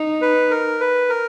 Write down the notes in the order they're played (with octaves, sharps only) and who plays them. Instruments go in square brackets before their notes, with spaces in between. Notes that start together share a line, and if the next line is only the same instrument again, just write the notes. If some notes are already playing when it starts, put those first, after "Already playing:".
Already playing: [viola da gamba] D#4
[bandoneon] B4
A#4
B4
A#4